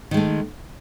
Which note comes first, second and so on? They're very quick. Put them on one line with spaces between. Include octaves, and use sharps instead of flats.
D#3 G#3 A3